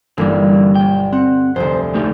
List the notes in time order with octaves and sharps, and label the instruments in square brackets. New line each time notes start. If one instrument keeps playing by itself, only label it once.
[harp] G1 G3 [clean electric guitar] D3 E3 A#3
[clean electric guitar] B1 G5
[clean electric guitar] C4 [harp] F#5
[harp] F1 D2 [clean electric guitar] C5
[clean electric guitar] A3 D#4 G4